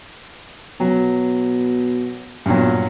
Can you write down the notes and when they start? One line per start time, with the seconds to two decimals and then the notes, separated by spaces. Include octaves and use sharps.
0.80 B2 F#3
2.46 B1 G2 A#2 F#3